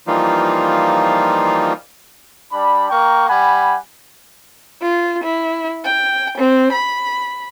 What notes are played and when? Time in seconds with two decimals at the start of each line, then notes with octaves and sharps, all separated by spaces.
0.07 E3 F3 G3 A#3 D#4 F4
2.51 G3 D4 B5
2.90 A#3 A#4 G5 C#6
3.29 G3 F#5 G#5 B5
4.81 F4
5.23 E4
5.83 G5
6.38 C4
6.72 B5